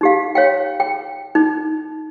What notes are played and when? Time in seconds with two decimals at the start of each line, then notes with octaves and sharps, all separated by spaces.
0.01 D#4 G4 F5
0.35 C#5 F5 G5
0.80 G5
1.35 D#4